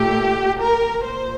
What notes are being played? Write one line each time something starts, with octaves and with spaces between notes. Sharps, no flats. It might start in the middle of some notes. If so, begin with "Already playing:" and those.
Already playing: A#2 A3 G4
A#4
A#2 C5